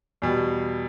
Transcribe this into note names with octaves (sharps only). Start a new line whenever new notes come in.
E2 B2 G3